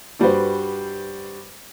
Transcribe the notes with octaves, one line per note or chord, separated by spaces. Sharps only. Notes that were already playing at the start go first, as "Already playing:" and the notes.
G2 G3 F#4 B4 C5